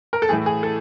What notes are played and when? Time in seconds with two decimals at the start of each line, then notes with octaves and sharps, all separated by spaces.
0.13 A#4
0.22 A4
0.29 A2 E3 A3 G#4
0.46 G#4
0.63 A4